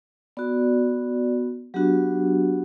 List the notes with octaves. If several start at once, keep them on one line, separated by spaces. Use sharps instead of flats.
B3 F#4 D5
F#3 B3 D4 F#4 G4